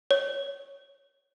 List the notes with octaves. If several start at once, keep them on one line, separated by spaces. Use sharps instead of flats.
C#5